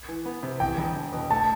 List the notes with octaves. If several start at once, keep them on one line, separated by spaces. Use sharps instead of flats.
E3
B3
C3
E2 G5
E1
E1
B2
A3 A5